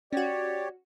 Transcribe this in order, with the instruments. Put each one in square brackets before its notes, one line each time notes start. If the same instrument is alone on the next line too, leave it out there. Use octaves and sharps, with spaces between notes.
[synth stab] C#4 F#4 [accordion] G4 C#5 [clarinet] D5